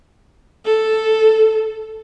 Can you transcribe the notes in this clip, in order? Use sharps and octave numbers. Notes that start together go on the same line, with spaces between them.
A4